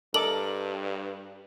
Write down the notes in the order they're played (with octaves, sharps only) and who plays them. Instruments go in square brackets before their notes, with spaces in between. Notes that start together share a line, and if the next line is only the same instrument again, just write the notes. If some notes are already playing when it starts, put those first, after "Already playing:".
[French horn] G2 [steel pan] A4 D6 [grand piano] A#4 D5 D#5 [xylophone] F#7